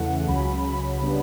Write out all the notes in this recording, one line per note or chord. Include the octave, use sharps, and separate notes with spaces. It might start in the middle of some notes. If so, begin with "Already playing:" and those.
Already playing: E2 C#3 E3 A3 F#5
C#2 C#3 F#3 C#4 B5
B5
C#3 G3 B3 D4